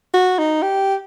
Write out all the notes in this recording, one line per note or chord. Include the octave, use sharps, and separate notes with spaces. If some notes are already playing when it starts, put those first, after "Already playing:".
F#4
D#4
G4